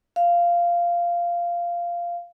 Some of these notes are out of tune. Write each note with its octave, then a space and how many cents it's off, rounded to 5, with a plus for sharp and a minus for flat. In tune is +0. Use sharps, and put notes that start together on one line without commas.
F5 -10